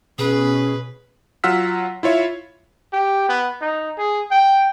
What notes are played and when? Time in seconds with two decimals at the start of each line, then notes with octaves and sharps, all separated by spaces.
0.19 B2 C#4 G#4 B4
1.44 F#3 F4 F#5 E6 F6 B6
2.03 E4 F4 C#5 E5
2.93 G4
3.29 B3
3.61 D#4
3.98 G#4
4.31 G5